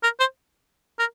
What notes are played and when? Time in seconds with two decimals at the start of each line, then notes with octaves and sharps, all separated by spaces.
0.03 A#4
0.20 C5
0.99 A#4